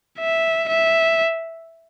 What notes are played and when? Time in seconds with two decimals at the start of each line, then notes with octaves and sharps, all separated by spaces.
0.20 E5
0.69 E5